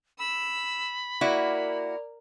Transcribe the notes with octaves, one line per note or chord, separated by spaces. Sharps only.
B5 E6
A#3 E4 F#4 A#4 D5